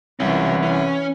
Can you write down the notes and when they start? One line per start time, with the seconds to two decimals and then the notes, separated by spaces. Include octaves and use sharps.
0.20 C2 E3 C#4 F4
0.63 C#4